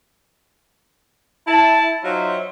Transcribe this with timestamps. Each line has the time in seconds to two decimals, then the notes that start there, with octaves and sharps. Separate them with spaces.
1.48 E4 A5
2.04 F#3 D#4 F4 F#4 C5 E5